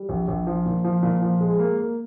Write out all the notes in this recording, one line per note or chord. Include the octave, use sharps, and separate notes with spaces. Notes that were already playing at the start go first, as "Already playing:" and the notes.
Already playing: G3
A#1
A#1
F3
A#2
F3
A#2
F3
G#3
A#3
A#3